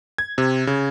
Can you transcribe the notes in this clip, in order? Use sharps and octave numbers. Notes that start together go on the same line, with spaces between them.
G#6
C3
C#3